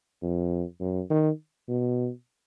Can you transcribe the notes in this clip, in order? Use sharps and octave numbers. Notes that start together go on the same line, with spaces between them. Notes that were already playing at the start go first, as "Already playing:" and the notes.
F2
F#2
D#3
B2